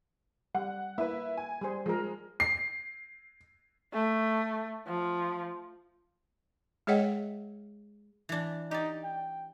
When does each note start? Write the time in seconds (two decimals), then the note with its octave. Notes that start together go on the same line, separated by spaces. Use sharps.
0.55 G3 F#5
0.98 A#3 E4 B4
1.37 G#5
1.61 G3 G#4 C5
1.86 F3 G#3 A#4
2.40 C7
3.93 A3
4.87 F3
6.87 G#3 G#4 C#5 D#5 F#5 G5
8.29 E3 D4
8.71 D#4 G4 D5
9.04 G5